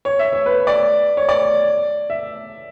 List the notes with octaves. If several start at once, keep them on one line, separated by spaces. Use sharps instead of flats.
C#5
E5
C#5
B4
D5
C#5
D5
E5